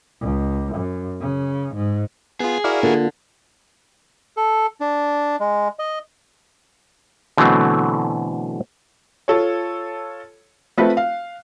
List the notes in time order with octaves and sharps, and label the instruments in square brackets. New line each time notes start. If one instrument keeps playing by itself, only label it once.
[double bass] C#2
F#2
C#3
G#2
[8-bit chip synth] B3 F4 [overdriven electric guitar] G#4
[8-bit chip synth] E4 F#4 A#4 [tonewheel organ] D5 F5
[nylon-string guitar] D3 [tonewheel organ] A#3 F4
[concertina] A4
D4
G#3
D#5
[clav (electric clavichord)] B2 D3 E3 F#3 A3 C4
[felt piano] F4 A4 C#5
A3 C4 F4 B4
F5